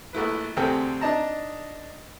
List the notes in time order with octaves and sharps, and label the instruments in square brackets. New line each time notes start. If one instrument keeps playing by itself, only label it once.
[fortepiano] A#1 A3 E4 B4
D2 C3 C4 G#4 A4 G5
D4 D#4 D#5 A5 A#5